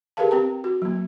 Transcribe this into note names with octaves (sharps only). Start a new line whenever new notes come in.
G4 G#4 A#4 B4 F5 A5
C4 G4 G5 A#5
F#4
F#3 A#3